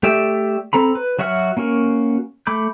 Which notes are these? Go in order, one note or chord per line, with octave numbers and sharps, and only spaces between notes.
A3 G4 D5 E5
C4 A4 A#5 B5
B4
F#3 F#4 E5 F#5 F6
A#3 C#4 F#4 A#4
A3 B5 D6 G6